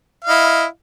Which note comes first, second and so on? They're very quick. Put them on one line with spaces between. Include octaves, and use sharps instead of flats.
F5 D#5 E4